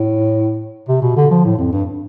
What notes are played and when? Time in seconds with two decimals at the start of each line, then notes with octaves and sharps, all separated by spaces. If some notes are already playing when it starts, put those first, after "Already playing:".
Already playing: A2
0.88 C3
1.02 B2
1.17 D3
1.31 F3
1.45 A2
1.58 F2
1.73 G2